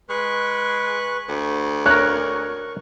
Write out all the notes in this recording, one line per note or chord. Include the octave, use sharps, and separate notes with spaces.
G#3 B4 C#6 F#6
D2
A#4 C#5 C#6 F#6